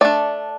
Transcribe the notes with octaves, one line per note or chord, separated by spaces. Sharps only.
A3 D4 D5